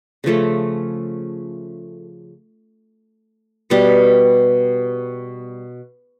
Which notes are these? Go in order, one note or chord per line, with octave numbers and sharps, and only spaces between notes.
C#3 F3 A3 C#4
B2 G3 B3